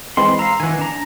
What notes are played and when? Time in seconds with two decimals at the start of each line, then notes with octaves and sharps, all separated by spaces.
0.17 E3 G#3 C4 B5 C6
0.39 F5 A#5 E6
0.60 D#3 E3 F#5 G#5
0.79 D4 A#5